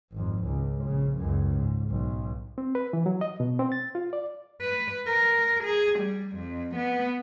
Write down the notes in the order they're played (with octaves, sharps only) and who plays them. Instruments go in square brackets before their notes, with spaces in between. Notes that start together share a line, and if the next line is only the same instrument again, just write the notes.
[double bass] G#1 F2
C#2
A#1 C#3
C#2 F#2
G#2
B1
[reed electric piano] C4
B4
E3
F#3
D#5
B2
C4
A6
F4
D5
[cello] B4
A#4
G#4
G3
F2
B3